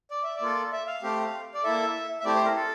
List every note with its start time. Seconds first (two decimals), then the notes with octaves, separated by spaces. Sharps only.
0.11 D5
0.23 E5
0.36 D5
0.41 A#3 F4 A4
0.72 E5
0.87 F5
1.03 A3 C4 G4
1.54 D5
1.64 A#3 E4 A4 E5
2.20 E5
2.25 A3 C4 E4 G4 D5
2.35 C5
2.45 A#4
2.55 A4